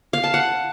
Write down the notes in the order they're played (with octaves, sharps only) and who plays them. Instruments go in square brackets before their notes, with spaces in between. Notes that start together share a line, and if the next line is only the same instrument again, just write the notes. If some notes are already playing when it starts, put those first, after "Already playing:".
[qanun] F5
A5
F#5